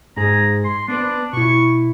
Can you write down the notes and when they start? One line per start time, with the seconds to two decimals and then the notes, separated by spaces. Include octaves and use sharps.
0.17 G#2 G#4 A#5
0.65 C6
0.88 B3 D4 B4
1.33 B2 E4 C#6